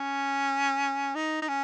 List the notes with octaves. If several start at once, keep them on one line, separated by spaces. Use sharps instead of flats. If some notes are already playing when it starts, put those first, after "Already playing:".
Already playing: C#4
D#4
D#4
C#4